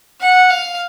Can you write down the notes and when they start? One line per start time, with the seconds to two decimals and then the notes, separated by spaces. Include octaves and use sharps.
0.20 F#5
0.50 F5